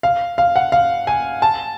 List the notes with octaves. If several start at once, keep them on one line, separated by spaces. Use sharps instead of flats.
F5
F5
F#5
F5
G#5
A5